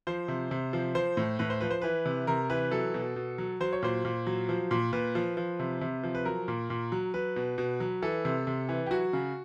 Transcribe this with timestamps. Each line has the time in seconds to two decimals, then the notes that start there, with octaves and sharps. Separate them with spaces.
0.07 F3 C5
0.28 C3
0.51 C3
0.73 F3
0.95 F3 C5
1.17 A2
1.39 A2 B4
1.50 C5
1.60 F3 B4
1.70 C5
1.82 E3 B4
2.05 C3
2.27 C3 A#4
2.50 E3 B4
2.71 F#3 A4
2.94 B2
3.16 B2
3.38 F#3
3.60 F#3 C5
3.73 C#5
3.82 A#2 C5
4.05 A#2
4.27 F#3
4.49 F3
4.71 A#2
4.93 A#2 B4
5.15 F3
5.37 F3
5.59 C3
5.81 C3
6.03 F3
6.15 B4
6.25 F#3 A#4
6.48 A#2
6.70 A#2
6.92 F#3
7.14 F#3 B4
7.36 B2
7.58 B2
7.80 F#3
8.02 E3 A4
8.25 C3
8.47 C3
8.69 E3
8.86 G4
8.91 F#3 F#4
9.13 C#3